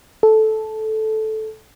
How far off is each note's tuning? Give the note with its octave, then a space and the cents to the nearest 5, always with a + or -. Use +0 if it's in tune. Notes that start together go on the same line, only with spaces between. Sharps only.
A4 -10